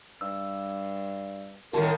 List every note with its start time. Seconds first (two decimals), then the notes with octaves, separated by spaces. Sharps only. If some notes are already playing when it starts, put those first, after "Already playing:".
0.21 G2 E6
1.73 G1 A2 D#3 F#4 A#4 A5